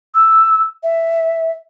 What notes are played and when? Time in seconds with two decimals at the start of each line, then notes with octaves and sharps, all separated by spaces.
0.14 E6
0.83 E5